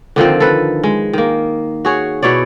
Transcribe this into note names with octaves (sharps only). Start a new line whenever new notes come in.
D3 D#3 F3 C4
A4 B4
G#3
D#3 A#3
F#4 G#4 C#5
B2 E4 C#5 D5